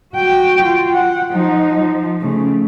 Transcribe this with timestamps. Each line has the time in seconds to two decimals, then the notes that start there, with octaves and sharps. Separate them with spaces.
0.15 F#4 G5
0.65 F4
0.94 F#5
1.31 F3 D#4
1.82 F3
2.20 C#3 A3